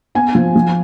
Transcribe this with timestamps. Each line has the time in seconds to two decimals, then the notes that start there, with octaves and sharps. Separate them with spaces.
0.15 B3 G#5
0.35 F3
0.56 F3